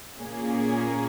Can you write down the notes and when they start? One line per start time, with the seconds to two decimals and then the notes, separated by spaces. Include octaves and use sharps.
0.20 A#2 A#3 C#4 G#4